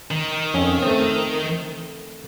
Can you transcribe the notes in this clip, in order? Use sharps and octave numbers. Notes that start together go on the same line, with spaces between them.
D#3
F2 C#4 G#5
A3 C4